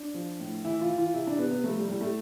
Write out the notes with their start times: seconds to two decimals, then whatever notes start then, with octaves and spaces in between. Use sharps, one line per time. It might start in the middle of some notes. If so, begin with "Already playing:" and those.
Already playing: D4
0.14 F3
0.39 A2
0.65 E3 E4
0.81 F4
0.89 E3
0.98 F4
1.14 C3 E4
1.27 D4
1.38 C3 B3
1.51 B3
1.64 F3 A3
1.76 G3
1.89 A2 G3
2.01 A3